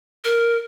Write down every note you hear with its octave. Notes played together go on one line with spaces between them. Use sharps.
A#4